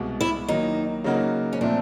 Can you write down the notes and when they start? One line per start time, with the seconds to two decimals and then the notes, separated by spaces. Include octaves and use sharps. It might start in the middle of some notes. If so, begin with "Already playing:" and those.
Already playing: C2 B2 G#3
0.21 E4
0.48 D#3 F#3 A#3 D#4
1.04 C#3 F#3 A#3 D#4 F#4
1.53 C#4
1.61 A#2 F3 A3 C4 D4